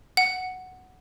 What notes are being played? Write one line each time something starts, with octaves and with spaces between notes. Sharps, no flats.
F#5